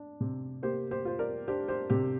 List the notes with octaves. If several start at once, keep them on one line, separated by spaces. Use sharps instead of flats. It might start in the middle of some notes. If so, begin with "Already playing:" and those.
Already playing: D4
C3
A#3 G4 C5
G4 C5
F4 C5
A#4 D5
D4 G4 C5
G4 C5
C3 G4